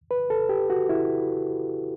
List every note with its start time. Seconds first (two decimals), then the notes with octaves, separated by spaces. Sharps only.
0.11 B4
0.30 A4
0.49 G4
0.70 F#4
0.89 E4